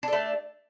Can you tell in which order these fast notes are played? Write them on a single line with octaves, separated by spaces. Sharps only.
D4 A4 A3